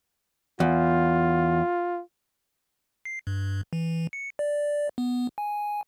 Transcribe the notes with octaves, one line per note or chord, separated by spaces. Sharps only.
E2 F4
C7
G2
E3
C#7
D5
B3
G#5